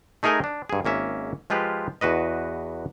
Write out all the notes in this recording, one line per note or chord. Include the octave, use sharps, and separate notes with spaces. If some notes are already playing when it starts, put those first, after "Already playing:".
A3 D#4 G#4 A#4 D#5 G#5
D4
G2 G#4
G#1 A#3 C#4 E5
F3 G#3 F4 G4 B4
E2 F#4 B4 D#5